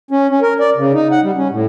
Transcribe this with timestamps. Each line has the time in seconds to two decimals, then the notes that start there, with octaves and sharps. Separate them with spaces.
0.11 C#4
0.30 C#4
0.42 A#4
0.60 D5
0.77 C#3
0.94 D#4
1.11 F#5
1.23 G3
1.36 C#4
1.51 A2